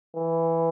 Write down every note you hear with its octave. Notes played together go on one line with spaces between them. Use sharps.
E3